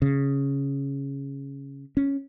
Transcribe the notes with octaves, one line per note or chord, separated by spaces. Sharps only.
C#3
C#4